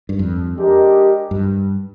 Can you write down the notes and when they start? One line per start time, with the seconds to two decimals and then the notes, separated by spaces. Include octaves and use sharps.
0.09 G2
0.19 F2
0.56 G#3 D4 G4 A#4 D#5
1.31 G2